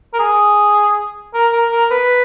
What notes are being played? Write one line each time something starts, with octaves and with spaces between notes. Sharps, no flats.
A#4
G#4
A#4
A#4
A#4
B4